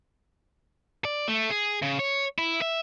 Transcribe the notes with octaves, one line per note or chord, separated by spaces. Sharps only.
D5
A3
G#4
C#3
C#5
E4
E5